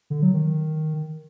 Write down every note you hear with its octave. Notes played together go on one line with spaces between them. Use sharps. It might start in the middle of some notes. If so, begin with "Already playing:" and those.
D3
F#3
D#3